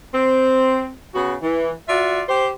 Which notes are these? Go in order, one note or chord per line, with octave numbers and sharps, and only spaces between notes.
C4
C#3 B3 F#4
E3
F4 F#4 D5 E5
G4 C5